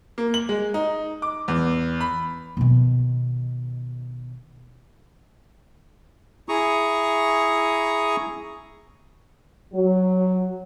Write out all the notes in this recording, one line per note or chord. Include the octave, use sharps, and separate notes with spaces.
A#3
F#7
G#3
D#4
D6
E2
B5
B2 D#3
E4 G#4 A#5 C#6 D#6
F#3